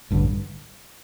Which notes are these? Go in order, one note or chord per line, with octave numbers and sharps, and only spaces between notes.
A1 G2 D3